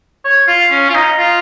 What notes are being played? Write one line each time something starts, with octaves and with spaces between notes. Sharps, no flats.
C#5
F4
C#4
F4
D#4
F4